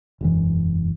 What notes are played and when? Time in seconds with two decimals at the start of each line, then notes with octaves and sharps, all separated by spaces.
0.21 E1 F#2 E3